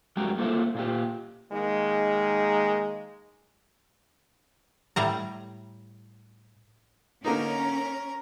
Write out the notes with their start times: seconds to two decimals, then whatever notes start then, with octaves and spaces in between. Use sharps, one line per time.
0.17 F#2 G3 G#3 F#4 G5 A#5
0.38 A3 A#3 F4 A4 C5 E5
0.75 A#2 F4 G4
1.52 D#3 G#3 A#3 D#4
4.96 A2 G3 A#5
7.25 D3 A#3 C#4 D#4 A#4